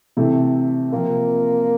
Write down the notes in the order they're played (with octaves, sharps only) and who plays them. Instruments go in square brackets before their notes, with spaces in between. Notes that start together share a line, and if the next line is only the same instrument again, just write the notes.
[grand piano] C3 E3 A3
[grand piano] C3 F3 C4 F4 [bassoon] A#3